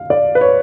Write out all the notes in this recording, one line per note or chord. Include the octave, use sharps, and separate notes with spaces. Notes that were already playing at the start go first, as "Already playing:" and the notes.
Already playing: F5
D5
B4
C#5